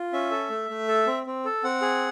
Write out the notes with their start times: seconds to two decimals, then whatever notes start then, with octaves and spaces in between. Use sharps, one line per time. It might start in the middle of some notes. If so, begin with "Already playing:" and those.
Already playing: F4
0.13 C#4 E5
0.31 A4
0.50 A3
0.70 A3
0.88 A4
1.07 C4
1.26 C4
1.45 A4
1.64 C4 F#5
1.82 G#4